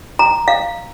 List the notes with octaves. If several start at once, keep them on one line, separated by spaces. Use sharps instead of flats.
A#5
F5